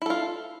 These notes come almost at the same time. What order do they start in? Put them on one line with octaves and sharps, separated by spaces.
E4 A4 F4